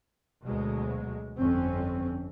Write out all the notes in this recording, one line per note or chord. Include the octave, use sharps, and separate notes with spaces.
D2 B2 F#3 G#3
G1 F2 C4 C#4